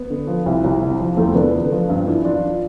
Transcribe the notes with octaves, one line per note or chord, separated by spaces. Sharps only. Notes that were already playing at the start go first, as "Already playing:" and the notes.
Already playing: B3
D3
F3
C2
C2
C3
F3
E2 A3 C4
E2 B3 D4
D3
F3
G2
E3
E3 D4 F4